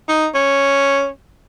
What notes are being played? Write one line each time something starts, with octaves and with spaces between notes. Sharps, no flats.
D#4
C#4